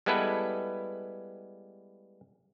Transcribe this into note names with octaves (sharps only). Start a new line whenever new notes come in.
G3 G#3 B3 E4 A4 B4